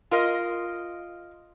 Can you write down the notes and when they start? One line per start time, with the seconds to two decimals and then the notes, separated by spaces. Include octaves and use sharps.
0.11 F4 A#4 D#5